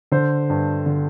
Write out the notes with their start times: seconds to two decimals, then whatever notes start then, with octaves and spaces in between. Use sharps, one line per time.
0.12 D3 C5
0.50 G2
0.86 D3